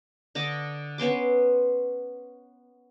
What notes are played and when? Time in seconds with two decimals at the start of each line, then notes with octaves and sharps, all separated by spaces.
0.35 D3 D#5 D6
0.98 B3 C#4 C6 D6